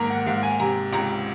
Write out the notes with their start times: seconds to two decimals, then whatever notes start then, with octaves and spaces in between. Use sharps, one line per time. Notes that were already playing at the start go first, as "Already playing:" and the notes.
Already playing: G#2 D#3 A#3 A#5
0.10 F#5
0.26 G#2 F5
0.43 G#5
0.60 C3 A#5
0.92 C#2 A#5